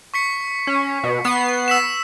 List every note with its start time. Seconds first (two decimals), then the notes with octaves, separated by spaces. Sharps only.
0.14 C#6 B6 C#7
0.67 C#4
1.04 B2
1.24 B3 C7
1.68 E6 B6 E7